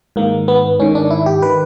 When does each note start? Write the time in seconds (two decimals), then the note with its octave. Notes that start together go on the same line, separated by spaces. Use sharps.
0.16 G#2 D#3 A#3
0.48 B3
0.79 G#2 D#3 C#4
0.95 D4
1.10 E4
1.26 G4
1.42 D#3 B4